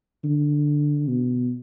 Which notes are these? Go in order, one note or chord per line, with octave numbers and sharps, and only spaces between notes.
D3
B2